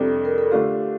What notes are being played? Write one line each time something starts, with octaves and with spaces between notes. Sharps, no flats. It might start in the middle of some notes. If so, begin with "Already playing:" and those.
Already playing: F2 C3 G3 D4 A4
A#4
A4
D3 A3 D4 F4 G4